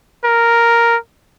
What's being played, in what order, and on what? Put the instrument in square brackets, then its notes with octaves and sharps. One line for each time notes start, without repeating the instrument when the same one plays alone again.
[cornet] A#4